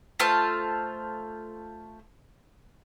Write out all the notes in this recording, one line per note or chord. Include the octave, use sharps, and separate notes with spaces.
A3 F4 C5 A5